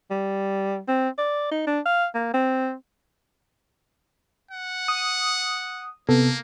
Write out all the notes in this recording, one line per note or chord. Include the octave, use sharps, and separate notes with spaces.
G3
C4
D5
D#4
D4
F5
A#3
C4
F#5
D#6
C3 A#3 B3 A4